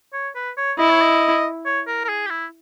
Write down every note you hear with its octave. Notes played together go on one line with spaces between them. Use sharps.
C#5
B4
C#5
E4 D#5
C#5
D#5
C#5
A#4
A#4
G#4
G4
E4